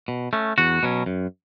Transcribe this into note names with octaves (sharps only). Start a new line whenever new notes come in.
B2
A3 C#4
E2 F#4
B2 F#3 C#4
F#2